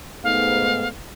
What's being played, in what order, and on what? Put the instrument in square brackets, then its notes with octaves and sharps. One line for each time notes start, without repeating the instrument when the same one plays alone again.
[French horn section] G#2 A3 B3 [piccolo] F5